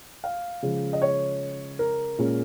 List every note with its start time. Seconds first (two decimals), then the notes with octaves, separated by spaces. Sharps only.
0.24 F5
0.63 C#3 F3 G#3
0.93 D#5
1.02 C#5
1.79 A#4
2.19 A#2 G#3 C#4